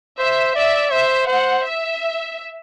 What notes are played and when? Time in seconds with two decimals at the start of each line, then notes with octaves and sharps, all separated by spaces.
0.19 C5 E5
0.56 D5 E5
0.92 C5 E5
1.28 C5 F#5
1.65 E5